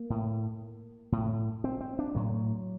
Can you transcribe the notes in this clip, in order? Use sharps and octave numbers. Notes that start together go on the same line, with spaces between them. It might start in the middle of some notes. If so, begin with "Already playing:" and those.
Already playing: A#3
A2
A2
C4
C4
D4
A2 F#3